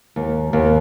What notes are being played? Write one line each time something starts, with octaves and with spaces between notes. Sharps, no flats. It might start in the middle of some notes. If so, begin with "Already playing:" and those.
D#2
D#2